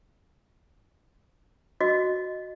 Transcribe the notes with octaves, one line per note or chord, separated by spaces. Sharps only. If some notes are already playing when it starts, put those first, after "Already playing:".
F#4 D#5